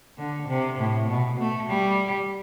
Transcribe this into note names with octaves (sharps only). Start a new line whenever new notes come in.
D3
C3
A2
B2
A3
G3